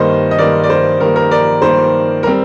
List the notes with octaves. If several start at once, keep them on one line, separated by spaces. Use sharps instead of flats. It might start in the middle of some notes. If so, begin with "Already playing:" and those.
Already playing: G2 D#3 A#3 C5 D#5
D#5
G2 D#3 A#3 A#4 D5
D5
C5
G2 D#3 A#3 A#4
A#4
A#4 D5
G2 D#3 A#3 C5
A#4
G3 C4